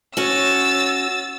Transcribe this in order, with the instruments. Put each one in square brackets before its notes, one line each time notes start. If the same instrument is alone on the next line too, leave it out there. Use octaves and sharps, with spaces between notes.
[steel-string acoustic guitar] C#4 F#4 C#5 [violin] E6 A6